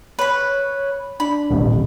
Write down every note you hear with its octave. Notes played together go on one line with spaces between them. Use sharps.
B4 C#5 B5
D4 B5
D#1 A1 C3